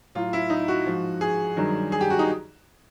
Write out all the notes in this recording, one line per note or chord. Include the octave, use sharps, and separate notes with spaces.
A2 F#3 F4
E4
D#4
F#4
G#2 F3
G#4
G2 D#3 F#3
G#4
G4
F#4
D#4